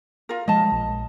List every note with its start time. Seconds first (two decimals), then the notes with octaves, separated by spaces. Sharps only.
0.29 F4 A#4
0.48 F3 G#3 D#5 A5
0.72 A#1